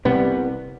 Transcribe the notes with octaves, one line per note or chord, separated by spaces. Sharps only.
C2 C3 G3 B3